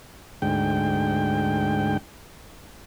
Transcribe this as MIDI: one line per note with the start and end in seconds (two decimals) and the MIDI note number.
0.42 1.97 38
0.42 1.97 44
0.42 1.97 79